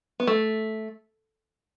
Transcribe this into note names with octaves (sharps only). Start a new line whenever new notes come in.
B3
A3